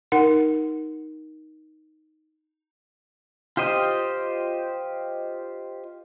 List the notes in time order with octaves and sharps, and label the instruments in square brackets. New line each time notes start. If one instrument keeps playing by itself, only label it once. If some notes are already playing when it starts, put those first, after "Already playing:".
[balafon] D#4 A#4 F#5
[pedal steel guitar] F4 G4 C5 D#5